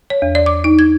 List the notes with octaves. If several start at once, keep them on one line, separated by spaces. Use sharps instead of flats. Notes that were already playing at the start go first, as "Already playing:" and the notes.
C#5
E2
D5
D6
D#4
G#6